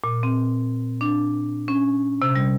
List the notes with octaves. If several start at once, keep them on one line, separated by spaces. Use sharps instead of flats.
A#2
C4
D4
C#4
C3
G3